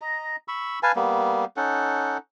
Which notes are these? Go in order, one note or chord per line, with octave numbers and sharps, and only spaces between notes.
D#5 A#5
B5 C#6 E6
B4 F5 G#5 A5
G3 A#3 B3
C#4 D#4 A4 F#5